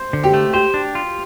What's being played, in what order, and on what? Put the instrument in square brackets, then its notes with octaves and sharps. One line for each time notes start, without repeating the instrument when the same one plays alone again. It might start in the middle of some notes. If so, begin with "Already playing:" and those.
Already playing: [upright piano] C5
[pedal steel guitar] D3
[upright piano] G4
[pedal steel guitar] A3
[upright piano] G4 [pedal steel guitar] C5
[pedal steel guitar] D4
F4